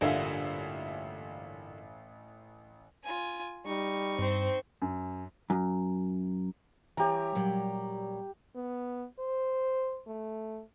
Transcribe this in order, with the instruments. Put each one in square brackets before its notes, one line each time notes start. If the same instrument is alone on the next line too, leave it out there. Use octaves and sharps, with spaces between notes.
[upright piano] A1 E5 F5 [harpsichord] G2 A#2 D3 [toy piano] D4 G#5
[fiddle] F4 G#5
[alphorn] G3 [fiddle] D#4 C#6
[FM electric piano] G2 [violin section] C4 C5
[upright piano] F#2
[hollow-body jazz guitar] F#2
[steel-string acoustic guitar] E3 C#5 [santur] G4 A#5
[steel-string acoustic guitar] A#2 F#3 G3
[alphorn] B3
C5
A3